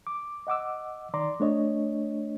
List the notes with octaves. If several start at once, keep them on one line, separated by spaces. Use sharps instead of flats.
D6
D#5 F#5 D6 E6
D#3 D5 A#5 C6 D6
A3 D4 C#5 D#5